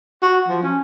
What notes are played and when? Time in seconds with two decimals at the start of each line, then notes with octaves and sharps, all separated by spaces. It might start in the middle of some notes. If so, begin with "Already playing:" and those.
0.22 F#4
0.48 F3
0.63 C#4